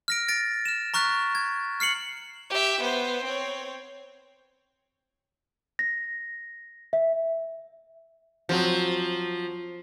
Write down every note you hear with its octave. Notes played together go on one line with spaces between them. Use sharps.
F6 A#6 D7
A6 A#6 D7
F6 E7
A#5 C#6 F6 F#6 A6 B6
G#6
F6 C7 C#7 F#7
G4 E5
B3 C5
C4 C#5
A#6
E5
F3 F#3 C4 F#4